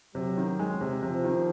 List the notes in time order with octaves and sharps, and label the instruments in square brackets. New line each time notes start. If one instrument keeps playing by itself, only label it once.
[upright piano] C3 [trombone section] F#3
[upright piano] D#3
G#3
C3
[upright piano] C3 [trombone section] F3
[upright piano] D#3